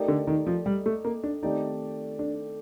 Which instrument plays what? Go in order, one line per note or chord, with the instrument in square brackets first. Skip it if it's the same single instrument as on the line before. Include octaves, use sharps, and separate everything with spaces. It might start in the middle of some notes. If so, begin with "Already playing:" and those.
Already playing: [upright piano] A3 D#4 G4 A#4 D5
[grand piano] D3
D#3
F3
G3
A3
A#3
D4
[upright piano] D#3 A3 C4 G4 D5 [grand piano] D#4
[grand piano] D4